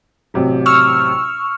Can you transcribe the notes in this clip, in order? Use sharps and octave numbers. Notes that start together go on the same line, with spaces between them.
A1 C3 F#3
C#6 E6 F6